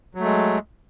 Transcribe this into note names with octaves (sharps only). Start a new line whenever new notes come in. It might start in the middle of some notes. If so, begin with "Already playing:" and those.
F#3 G#3 A3